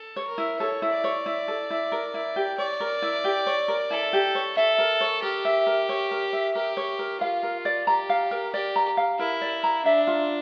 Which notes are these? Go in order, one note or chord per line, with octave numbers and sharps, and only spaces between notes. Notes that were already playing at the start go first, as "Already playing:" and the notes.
Already playing: A4
C#5
A#4
E4
A4 C#5
E4
D5
C#5
E4
A4
E4
A#4
E4
G4
C#5 D5
A#4
E4
G4
C#5
A#4
E4 A4
G4
C#5
A4 E5
A#4
C#5
G4 A#4
E5
A#4
C#5
A#4
E5
G4 A#4
C#5
A#4
F4 F5
A#4
D5
G4 A#5
F5
A#4
G4 D5
A#5
F5
E4 A#4
D5
A#5
D4 E5
F4